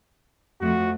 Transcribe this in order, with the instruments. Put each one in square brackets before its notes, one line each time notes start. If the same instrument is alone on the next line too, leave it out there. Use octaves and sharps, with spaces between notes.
[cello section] F2 A3 [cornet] F#4